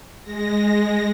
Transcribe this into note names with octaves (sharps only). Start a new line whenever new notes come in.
G#3 A#6